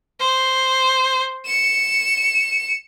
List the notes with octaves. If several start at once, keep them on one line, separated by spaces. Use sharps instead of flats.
C5
C#7 E7